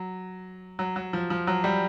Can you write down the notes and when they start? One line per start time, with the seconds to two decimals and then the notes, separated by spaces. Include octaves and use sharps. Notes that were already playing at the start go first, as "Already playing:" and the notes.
Already playing: F#3
0.79 F#3
0.96 F#3
1.13 F3
1.30 F3
1.47 F#3
1.64 G3